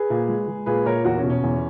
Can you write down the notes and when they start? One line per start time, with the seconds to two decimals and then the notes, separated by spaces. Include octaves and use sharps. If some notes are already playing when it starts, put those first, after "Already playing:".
Already playing: G#4 B4
0.10 A#2
0.28 G#3
0.48 G#3
0.66 A#2 G#4 B4
0.86 A#2 A#4 C#5
1.05 E2 F#4 A#4
1.18 C#4
1.24 B2
1.30 C#4
1.43 E2